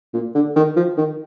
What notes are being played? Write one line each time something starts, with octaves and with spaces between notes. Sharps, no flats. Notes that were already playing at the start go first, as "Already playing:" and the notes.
A#2
D3
D#3
F3
D#3